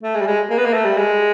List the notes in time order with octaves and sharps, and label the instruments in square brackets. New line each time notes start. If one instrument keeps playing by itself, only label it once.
[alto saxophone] A3
G#3
G3
G#3
A#3
B3
A#3
A3
G3
G#3